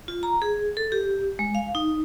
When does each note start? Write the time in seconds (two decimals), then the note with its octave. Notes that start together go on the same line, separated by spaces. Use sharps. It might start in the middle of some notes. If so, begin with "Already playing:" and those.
0.08 F4
0.23 A#5
0.42 G#4
0.77 A4
0.92 G4
1.39 G#3
1.55 F5
1.75 D#4